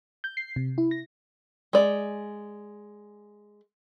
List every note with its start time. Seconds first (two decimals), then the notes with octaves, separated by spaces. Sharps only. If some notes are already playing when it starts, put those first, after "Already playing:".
0.24 G6
0.37 C7
0.56 C3
0.78 E4
0.91 A#6
1.73 G#3 D5